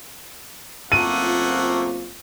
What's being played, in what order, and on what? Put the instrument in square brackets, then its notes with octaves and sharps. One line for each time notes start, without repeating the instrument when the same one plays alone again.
[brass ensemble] F#1 C4 F4 [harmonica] A3 A#3 F#5 [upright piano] D#7